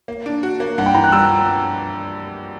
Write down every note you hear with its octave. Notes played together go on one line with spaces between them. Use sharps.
A#3
D4
F#4
A#3
G2 F#5
G5
E3 A#5
F#6
G3 E6